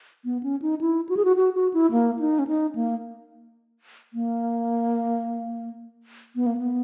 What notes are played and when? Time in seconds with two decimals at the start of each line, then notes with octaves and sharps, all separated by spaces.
0.25 B3
0.43 C#4
0.62 D#4
0.81 E4
1.09 F#4
1.17 G#4
1.25 F#4
1.36 F#4
1.55 F#4
1.74 E4
1.91 A#3
2.19 D#4
2.39 C#4
2.47 D#4
2.75 A#3
4.13 A#3
6.35 B3
6.46 A#3
6.57 B3